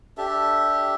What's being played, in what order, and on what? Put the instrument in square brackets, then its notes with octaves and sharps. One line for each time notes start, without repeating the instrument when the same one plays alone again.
[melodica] D4 G4 A4 E5